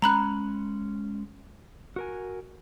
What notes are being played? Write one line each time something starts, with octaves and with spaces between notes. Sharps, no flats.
G#3 C#4 A#5 B5 F#6
F#4 A#4 G#5